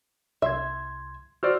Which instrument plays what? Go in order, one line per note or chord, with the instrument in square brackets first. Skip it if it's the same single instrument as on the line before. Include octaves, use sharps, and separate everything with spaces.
[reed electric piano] C2 C6 G#6 [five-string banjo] E5
[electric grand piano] F#4 C5 D5 [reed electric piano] F#5 E6 F6